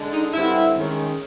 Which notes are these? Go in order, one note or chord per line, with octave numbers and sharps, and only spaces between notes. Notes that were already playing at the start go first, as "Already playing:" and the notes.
Already playing: D3 G#3
D#4
G2 D3 G3 C4 E4
D#3 G#3 C#4